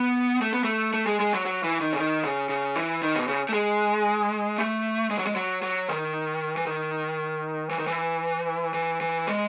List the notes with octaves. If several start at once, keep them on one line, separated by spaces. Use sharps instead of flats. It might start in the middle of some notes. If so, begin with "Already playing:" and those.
Already playing: B3
A3
B3
A3
A3
G#3
G#3
F#3
F#3
E3
D#3
C#3
D#3
C#3
C#3
E3
D#3
B2
C#3
A3
G#3
A3
G#3
F#3
G#3
F#3
F#3
D#3
E3
D#3
E3
D#3
E3
E3
E3
G#3